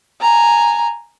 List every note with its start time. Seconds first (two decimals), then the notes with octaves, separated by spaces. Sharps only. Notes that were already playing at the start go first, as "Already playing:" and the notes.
0.21 G#5 A#5